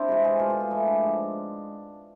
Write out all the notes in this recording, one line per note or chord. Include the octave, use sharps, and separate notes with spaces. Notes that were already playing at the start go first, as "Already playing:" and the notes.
Already playing: C4 D4 E4 C5 D5
C3 E3 G#3 G#4
G#4
B2 A3 F4
F4
G#4
G#2 E3 A3 E4
D4
G#2 F3 G#3